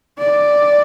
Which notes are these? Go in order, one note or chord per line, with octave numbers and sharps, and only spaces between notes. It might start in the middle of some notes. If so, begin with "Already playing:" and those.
D5